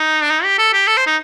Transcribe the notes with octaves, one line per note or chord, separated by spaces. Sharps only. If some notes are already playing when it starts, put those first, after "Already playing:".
Already playing: D#4
D4
D#4
G4
A4
G4
A4
C5
D#4